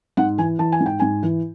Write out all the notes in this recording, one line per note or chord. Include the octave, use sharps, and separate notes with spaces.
G#2 F#5
E3 G#5
E3 A5
G#5
G#2
G5
G#2 G#5
E3